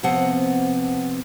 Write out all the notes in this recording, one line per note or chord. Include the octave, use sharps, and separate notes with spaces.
C3 F3 B3 C4 F#5